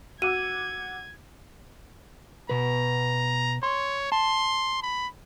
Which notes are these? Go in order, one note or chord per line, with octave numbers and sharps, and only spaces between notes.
F#4 F#5 D6 E6 G#6 D#7
B2 B4 A#5
C#5 C6
A5 C6
B5